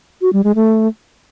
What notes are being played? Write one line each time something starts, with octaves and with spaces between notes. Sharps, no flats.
F#4
G3
G#3
A3